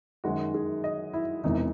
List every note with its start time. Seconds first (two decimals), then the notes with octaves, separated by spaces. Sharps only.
0.24 F#2 D#3 G#3 F#4
0.54 G#4
0.84 D#5
1.13 E4
1.43 E1 E2 C3 D#4